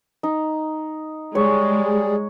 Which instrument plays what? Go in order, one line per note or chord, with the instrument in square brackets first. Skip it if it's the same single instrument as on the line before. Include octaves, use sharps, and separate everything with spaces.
[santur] D#4
[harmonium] G3 G#4 [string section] G#3 [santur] C#5